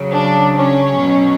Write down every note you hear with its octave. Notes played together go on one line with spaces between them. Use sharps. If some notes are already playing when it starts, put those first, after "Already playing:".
Already playing: C#3 F#3
D4
C#4
B2 F#3